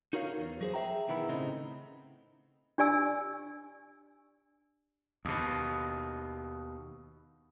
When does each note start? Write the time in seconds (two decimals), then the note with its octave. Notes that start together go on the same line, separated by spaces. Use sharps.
0.13 D#4 F#4 A#4 C#5 F5
0.39 E2
0.61 F#3 G#4 C5
0.74 G#4 B4 E5 G5 A#5
1.08 B2 D#3 E3 B3 E4
1.29 A2 C#3 C4 D#4
2.78 D4 G4 D5 G#5 E6
5.25 D#2 B2